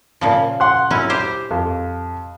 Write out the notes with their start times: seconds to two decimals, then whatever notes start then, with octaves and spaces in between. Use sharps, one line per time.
0.21 A#2 C#3 F3
0.60 F#5 C6 F#6
0.91 F#3 C#4 E4
1.10 G4 C5
1.51 F2